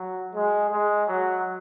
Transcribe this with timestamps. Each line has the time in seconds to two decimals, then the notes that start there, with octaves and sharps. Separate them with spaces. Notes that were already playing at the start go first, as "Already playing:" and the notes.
Already playing: F#3
0.33 G#3
0.70 G#3
1.07 F#3